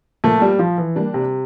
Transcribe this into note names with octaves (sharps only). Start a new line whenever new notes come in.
A#2 F3 A3 A#3
G3
F3
E3
G3 A#3 D4
C3